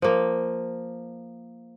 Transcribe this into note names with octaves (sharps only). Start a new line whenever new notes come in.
F3 A#3